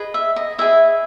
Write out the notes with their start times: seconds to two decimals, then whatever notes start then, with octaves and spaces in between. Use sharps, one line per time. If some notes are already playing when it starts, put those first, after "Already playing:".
Already playing: G#4 B4 D#5
0.14 E5
0.36 D#5
0.58 E4 G#4 D#5 E5